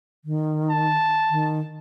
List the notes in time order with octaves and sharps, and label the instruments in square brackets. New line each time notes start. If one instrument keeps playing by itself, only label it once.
[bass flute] D#3
[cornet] A5
[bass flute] D#3